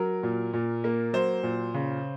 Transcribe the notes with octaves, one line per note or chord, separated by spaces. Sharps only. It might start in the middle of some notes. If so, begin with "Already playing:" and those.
Already playing: F#3 A#4
A#2
A#2
A#3
F#3 C5
A#2
C#3